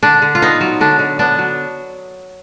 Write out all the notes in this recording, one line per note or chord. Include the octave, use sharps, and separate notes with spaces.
D3 D4
D3
F4
B3 D#4
F#3
D3 D4
D3
B3 D4
F#3